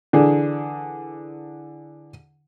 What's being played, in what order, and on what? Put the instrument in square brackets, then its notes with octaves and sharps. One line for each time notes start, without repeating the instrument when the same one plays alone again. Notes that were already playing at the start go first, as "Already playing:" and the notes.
[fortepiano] D3 E3 D4 G#4